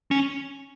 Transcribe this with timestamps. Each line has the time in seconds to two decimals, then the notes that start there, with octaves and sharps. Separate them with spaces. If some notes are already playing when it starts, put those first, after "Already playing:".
0.11 C#4